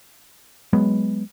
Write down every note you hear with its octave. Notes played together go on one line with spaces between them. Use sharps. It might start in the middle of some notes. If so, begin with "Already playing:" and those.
F#3 G#3 B3